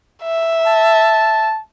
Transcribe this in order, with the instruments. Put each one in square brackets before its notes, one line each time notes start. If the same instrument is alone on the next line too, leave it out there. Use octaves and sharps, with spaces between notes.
[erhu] E5
[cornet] A5